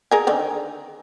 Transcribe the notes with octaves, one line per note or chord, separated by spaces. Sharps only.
G#4 A#4 G#5
D3 D#3 C4